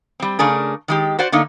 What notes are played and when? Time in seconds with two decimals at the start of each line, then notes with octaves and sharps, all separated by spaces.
0.20 G3 C4
0.39 C#3 A3 D4 G#4 A#4
0.88 D#3 G#3 G4
1.19 F#4 C5 D5 F#5
1.32 D3 A3 A#3 D#4